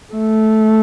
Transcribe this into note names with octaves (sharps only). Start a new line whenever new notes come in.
A3